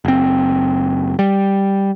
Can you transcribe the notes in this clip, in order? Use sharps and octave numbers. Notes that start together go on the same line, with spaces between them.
F#1 C4
G3